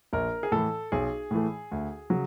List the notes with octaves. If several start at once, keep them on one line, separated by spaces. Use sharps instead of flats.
A#1 A#4
G#4
A2 E3 A4
B1 G#4
A2 E3 A3
D2
C#3 F#3